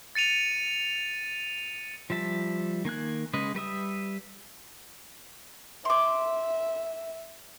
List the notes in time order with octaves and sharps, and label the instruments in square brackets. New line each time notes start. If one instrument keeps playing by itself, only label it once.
[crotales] A6 C#7 D#7 F7
[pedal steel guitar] F3 G3 E5 A5
D#3 A#3 G#5 F#6
C#3 G#3 B4 D#5
G3 B4 E5 D#6
[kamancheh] E5 [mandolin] C6 D6